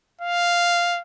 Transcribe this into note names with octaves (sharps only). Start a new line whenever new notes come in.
F5